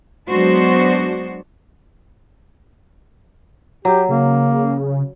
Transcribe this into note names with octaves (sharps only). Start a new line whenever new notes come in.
F#3 G#3 B3 D4 F#4 C5
F#3 G4
C#3 A#3